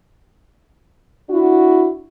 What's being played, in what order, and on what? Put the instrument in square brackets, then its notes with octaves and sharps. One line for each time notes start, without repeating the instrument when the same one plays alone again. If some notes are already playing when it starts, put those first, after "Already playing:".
[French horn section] D4 E4 F#4